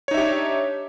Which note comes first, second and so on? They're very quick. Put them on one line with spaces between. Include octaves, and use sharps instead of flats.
C#5 D#4 E5 G4 D4